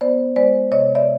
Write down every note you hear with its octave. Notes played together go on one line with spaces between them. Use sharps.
B3 C5 D5
G#3 C5 D5
C3 C#5 D#5
D5 E5